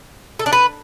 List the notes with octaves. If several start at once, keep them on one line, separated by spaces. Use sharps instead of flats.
A4
D4
B4